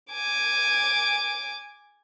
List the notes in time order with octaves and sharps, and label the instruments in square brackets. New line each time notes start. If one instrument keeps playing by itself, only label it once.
[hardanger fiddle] G#5 D6